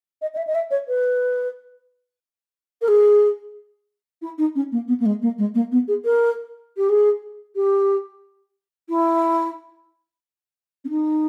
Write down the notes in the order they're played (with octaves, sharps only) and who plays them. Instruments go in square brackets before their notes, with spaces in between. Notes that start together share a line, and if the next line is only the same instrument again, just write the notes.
[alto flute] D#5
D#5
E5
D#5
E5
C#5
B4
A#4
G#4
E4
D#4
C#4
A#3
B3
A#3
G#3
A#3
G#3
A#3
B3
G#4
A#4
G4
G#4
G4
E4
C#4
D#4